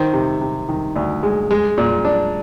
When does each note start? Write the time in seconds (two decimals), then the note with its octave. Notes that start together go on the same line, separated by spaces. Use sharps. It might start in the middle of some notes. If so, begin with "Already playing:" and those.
Already playing: D#3 C5
0.13 C3
0.41 C3
0.69 D#3
0.96 D2
1.23 G#3
1.51 G#3
1.78 A#2
2.05 D4